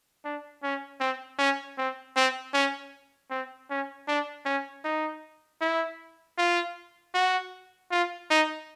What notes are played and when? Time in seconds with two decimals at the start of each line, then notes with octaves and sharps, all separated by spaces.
0.24 D4
0.63 C#4
1.00 C4
1.39 C#4
1.78 C4
2.16 C4
2.54 C#4
3.30 C4
3.70 C#4
4.08 D4
4.45 C#4
4.84 D#4
5.61 E4
6.38 F4
7.14 F#4
7.91 F4
8.30 D#4